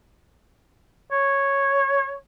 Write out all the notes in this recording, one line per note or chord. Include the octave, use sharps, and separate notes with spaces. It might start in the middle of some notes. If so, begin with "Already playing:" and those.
C#5